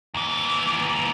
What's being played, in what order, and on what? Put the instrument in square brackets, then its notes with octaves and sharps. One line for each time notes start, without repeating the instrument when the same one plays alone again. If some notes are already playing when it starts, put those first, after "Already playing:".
[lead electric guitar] D#2 E3